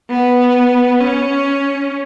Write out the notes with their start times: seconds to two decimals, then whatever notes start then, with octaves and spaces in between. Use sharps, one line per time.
0.10 B3
1.01 C#4